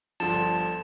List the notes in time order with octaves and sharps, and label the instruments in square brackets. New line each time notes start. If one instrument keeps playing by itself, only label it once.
[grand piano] G1 D3 F3 [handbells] A5